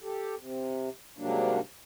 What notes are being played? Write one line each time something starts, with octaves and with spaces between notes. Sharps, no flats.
G4 A4
C3
G#2 C3 F#3 G3 A#3 D4